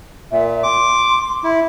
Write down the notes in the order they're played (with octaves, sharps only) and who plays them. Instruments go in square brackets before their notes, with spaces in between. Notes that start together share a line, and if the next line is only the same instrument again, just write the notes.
[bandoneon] A#2 [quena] E5
[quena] C6 [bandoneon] D6
[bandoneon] E4